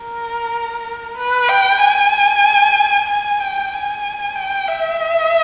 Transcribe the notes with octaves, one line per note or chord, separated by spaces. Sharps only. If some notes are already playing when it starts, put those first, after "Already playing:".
Already playing: A#4
B4
G5
G#5
G#5
G5
G#5
G5
E5